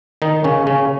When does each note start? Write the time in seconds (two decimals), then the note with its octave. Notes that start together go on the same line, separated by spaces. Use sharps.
0.22 D#3 D#4
0.44 C#3 C#4
0.67 C#3 C#4